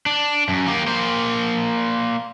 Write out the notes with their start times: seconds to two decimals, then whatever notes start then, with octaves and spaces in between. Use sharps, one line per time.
0.06 D4
0.49 F#2
0.67 A#3 G4
0.88 A#3 C5